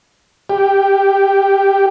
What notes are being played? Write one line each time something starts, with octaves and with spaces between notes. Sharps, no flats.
G4